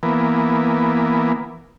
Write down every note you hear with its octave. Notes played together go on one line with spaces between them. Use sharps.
E3 A#3 B3